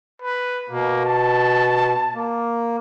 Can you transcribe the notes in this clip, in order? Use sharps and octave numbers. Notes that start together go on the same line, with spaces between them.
B4
B2 A#3
A5
A#3